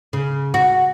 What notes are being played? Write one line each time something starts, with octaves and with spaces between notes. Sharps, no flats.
C#3
F#4